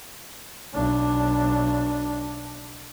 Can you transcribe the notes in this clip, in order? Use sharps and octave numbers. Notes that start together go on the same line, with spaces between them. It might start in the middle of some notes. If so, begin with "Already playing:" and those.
B1 D4